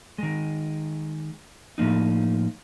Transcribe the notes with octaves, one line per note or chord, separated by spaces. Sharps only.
D#3 G#3
A2 F3 A#3 D#4